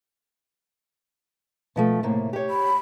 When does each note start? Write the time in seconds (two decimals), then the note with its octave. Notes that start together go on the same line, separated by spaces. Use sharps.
1.76 B2 F3 A3
2.03 A2 C3 A#3
2.33 G4 C#5
2.50 B5